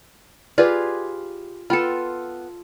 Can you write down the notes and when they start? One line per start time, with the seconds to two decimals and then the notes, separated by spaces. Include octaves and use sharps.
0.58 F4 G4 G#4 B4 D5
1.70 B3 F4 A4 G5 B5